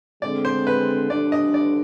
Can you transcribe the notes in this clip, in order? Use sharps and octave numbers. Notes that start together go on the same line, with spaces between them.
D3 G#3 C4 D5
C5
B4
D2 D3 G3 D4 D5
D#5
D5